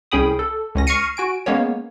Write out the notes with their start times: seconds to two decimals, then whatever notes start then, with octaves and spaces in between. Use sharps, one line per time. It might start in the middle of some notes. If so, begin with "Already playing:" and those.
0.12 C2 C#4 G#4 G5 B5 D#6
0.39 A4
0.75 C#2 C#4 A#6
0.87 C#6 F6 A#6 C7 C#7 D#7
1.17 F#4 G#5 D7
1.46 G#3 A#3 B3 C#4 C#5